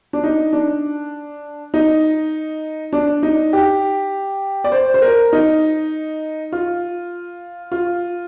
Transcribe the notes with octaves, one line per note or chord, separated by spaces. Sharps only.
D4
D#4
D4
D#4
D4
D#4
G4
D5
C5
C5
A#4
D#4
F4
F4